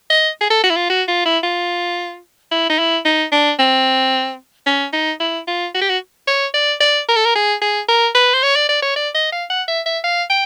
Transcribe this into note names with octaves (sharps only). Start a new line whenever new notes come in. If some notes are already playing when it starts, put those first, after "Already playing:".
D#5
G#4
A4
F#4
E4
F4
F#4
F4
E4
F4
E4
D#4
E4
D#4
D4
C4
C#4
D#4
E4
F4
F#4
G4
F#4
C#5
D5
D5
A#4
A4
A#4
G#4
G#4
A#4
B4
C5
C#5
D5
D5
C#5
D5
D#5
F5
F#5
E5
E5
F5
G5